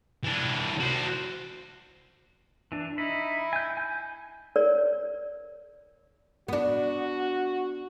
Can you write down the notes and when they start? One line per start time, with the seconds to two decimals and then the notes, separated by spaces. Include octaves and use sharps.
0.24 E3 D4
0.80 F#4 C5
2.72 E3 D4
2.98 D#4 E4 B5
3.53 G#5 G6
3.77 G#5 G6
4.56 A#4 C#5 D5
6.48 B3 D4 F#4